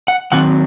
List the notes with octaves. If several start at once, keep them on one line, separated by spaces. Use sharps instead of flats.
F#5
D#3 F#3 C4 F#5